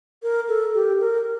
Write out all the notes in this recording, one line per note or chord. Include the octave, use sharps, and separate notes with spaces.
A#4
A4
G4
A#4